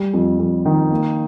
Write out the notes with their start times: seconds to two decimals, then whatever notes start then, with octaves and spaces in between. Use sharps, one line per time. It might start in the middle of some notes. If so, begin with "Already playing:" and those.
Already playing: G3
0.13 F2
0.39 F2
0.66 D#3
0.91 A#3